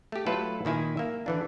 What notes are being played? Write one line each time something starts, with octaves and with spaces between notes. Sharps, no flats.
A3 G4
F#3 A3 E4 F4 A4 B4
A#2 D#3 E4 G#5
A#3 E5
D3 E3 D4